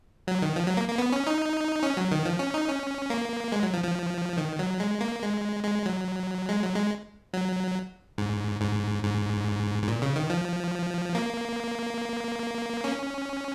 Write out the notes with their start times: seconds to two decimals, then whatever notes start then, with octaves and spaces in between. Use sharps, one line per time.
0.27 F#3
0.42 D#3
0.56 F3
0.67 F#3
0.77 A#3
0.88 A#3
0.98 B3
1.12 C#4
1.27 D#4
1.83 C#4
1.97 F#3
2.12 D#3
2.26 F3
2.39 C#4
2.54 D#4
2.68 C#4
3.10 A#3
3.52 G#3
3.63 F#3
3.74 F3
3.84 F3
4.37 D#3
4.59 F#3
4.80 G#3
5.01 A#3
5.22 G#3
5.64 G#3
5.86 F#3
6.49 G#3
6.62 F#3
6.75 G#3
7.34 F#3
8.18 G#2
8.61 G#2
9.03 G#2
9.83 G#2
9.88 A#2
10.02 C#3
10.16 D#3
10.30 F3
11.15 A#3
12.84 C#4